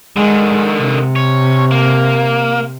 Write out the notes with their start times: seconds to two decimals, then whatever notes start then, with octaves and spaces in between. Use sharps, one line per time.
0.17 D3 D#3 G#3
0.78 C3
1.16 C#5
1.71 A#3